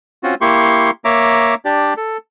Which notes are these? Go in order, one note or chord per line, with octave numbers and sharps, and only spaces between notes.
C4 C#4 F4 F#4
A#3 E4 G4 C6 C#6
A#3 C#5 E5 A#5 D6
D4 G4 D5
A4